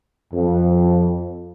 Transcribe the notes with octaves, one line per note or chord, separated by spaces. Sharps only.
F2